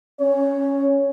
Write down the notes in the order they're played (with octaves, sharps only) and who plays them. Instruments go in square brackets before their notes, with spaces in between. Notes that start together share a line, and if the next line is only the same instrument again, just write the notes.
[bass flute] C#4 [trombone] C#5